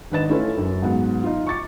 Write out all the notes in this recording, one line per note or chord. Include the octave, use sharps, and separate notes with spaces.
G#1 D4 B4 D#5 A6 E7
A3 C#4 E4 F4 A4 B4
F#2
G#2 F#3 B3
D#4 F4
C#6 D6 A6 C#7